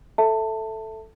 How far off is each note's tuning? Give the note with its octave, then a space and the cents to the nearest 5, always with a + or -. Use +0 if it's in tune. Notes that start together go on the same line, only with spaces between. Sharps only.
A4 +0 E5 +0 A5 +20